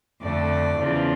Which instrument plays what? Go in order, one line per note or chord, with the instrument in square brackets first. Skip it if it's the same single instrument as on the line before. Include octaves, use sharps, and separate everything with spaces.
[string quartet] F2 D3 A3 D5
E2 C#3 F3